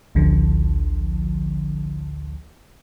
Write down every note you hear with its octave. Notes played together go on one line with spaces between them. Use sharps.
A1 D2 D3 F3